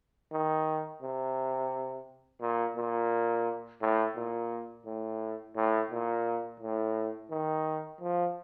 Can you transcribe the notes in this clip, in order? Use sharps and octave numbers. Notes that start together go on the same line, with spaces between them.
D#3
C3
A#2
A#2
A2
A#2
A2
A2
A#2
A2
D#3
F3